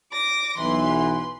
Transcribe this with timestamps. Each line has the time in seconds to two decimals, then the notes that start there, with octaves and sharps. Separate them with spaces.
0.12 D6 A#6
0.58 B1 E3 B4 C6